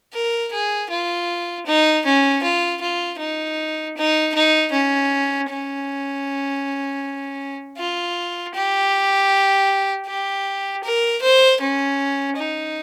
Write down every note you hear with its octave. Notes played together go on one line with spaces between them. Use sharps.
A#4
G#4
F4
D#4
C#4
F4
F4
D#4
D#4
D#4
C#4
C#4
F4
G4
G4
A#4
C5
C#4
D#4